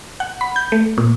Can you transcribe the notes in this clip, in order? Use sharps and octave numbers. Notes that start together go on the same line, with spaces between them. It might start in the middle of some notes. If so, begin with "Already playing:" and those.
F#5
B5
G6
A3
A#2